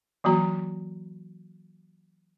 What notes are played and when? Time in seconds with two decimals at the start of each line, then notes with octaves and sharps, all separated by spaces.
0.24 E3 F#3 A#3 F#4 A#5